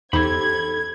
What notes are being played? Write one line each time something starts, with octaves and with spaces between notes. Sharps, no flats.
E2 D#4 G4 A4 C5 B5 G#6